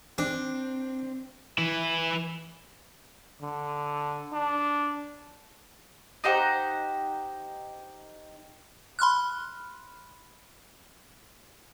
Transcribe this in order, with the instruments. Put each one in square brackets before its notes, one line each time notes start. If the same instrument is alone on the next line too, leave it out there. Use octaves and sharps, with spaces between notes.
[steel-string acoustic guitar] C4 [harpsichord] D4
[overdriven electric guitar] E3 E4
[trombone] D3
D4
[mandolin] D#4 G4 C5 F#5
[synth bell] B5 C6 F6 F#6